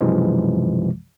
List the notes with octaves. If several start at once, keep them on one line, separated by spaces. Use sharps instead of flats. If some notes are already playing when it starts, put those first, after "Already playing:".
B1 F#2 C3 E3 F3 G#3